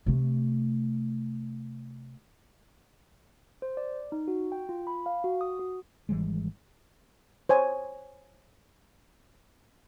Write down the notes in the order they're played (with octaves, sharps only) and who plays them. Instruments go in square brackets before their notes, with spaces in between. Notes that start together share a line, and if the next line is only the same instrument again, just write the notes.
[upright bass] C3 A3
[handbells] C5
D5
D#4
F#4
G5
F4
B5
F5
F#4
D#6
F#4
[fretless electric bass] G#1 E3 G3 G#3
[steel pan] C5 C#5 G#5